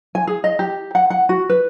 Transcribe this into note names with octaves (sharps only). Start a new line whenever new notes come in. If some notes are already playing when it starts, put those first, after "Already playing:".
G#5
G#4
D#5
G4
F#5
F#5
F#4
B4